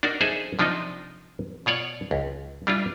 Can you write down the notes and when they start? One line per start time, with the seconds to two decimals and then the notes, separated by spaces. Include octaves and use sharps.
0.03 D4 D#4 F#4 A#4 D5
0.21 D#4 G#4 A4 C5 E5
0.59 C3 F3 D4 D#4 F4 D#5
1.66 B2 F4 C#5 D5
2.11 C#2
2.67 G3 D4 E4 F4